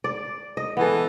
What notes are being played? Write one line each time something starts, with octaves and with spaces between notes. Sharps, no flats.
D5
D#5
E3 B3 A4